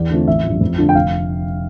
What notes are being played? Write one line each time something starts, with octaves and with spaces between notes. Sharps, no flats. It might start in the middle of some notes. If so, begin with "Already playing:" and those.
Already playing: E2 D5
D3 A3 C4 F4
A1 E5
G2 F3
F2
D3 A3 D4 F4
G5
F1 F5